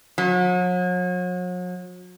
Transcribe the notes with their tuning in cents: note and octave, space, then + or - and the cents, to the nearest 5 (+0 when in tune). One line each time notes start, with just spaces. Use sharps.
F#3 -40